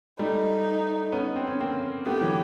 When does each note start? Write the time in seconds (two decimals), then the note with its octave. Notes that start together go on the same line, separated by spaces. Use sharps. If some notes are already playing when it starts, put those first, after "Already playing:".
0.19 G3 A3 D#4
1.12 B3 C#4
1.36 C4
1.47 C#4
1.60 A#3 C4
2.06 A3 B3 G4
2.21 E3 F#3